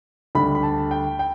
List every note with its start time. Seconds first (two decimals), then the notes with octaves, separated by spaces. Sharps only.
0.35 D2 D3 G3 B5
0.55 B5
0.63 A5
0.91 G5
1.19 G5